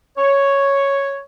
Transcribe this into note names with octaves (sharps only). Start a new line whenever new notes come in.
C#5